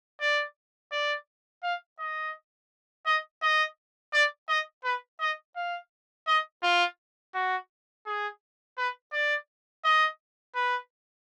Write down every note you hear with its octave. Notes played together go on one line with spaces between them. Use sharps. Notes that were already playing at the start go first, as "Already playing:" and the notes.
D5
D5
F5
D#5
D#5
D#5
D5
D#5
B4
D#5
F5
D#5
F4
F#4
G#4
B4
D5
D#5
B4